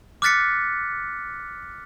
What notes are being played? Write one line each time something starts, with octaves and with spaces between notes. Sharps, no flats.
D6 F6 F#6 A6 B6 C#7